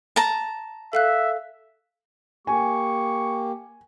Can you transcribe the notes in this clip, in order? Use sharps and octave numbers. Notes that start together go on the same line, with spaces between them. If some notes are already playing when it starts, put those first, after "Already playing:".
A5 A#5
A4 E5 F5 F#6
A#3 G4 G#5 C#6